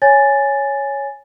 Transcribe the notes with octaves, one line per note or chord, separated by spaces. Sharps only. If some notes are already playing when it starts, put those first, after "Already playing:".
C#5 G#5 A6